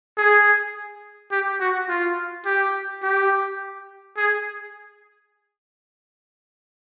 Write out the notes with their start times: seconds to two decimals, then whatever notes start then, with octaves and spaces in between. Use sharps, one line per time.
0.17 G#4
1.32 G4
1.60 F#4
1.89 F4
2.46 G4
3.03 G4
4.17 G#4